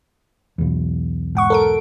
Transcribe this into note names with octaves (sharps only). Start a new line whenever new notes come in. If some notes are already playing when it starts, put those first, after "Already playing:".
B1 E2
G#2 F#5 C#6
A4 A#4 D7